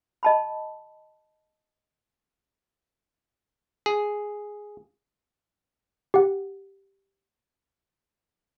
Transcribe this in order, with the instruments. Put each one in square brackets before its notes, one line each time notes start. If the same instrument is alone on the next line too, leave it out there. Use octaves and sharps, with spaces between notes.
[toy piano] D#5 A5 B5
[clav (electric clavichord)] G#4
[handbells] G4 F#5